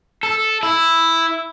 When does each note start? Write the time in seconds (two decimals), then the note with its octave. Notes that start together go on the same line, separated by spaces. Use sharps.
0.23 A4
0.63 E4